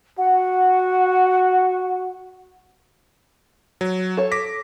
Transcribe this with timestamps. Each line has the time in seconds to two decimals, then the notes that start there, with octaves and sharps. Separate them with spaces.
0.19 F#4 F#5
3.81 F#3
4.17 A4 C#5
4.32 D6 A#6 B6